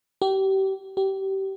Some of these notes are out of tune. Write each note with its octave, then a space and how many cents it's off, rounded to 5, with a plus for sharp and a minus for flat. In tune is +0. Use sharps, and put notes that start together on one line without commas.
G4 -30
G4 -25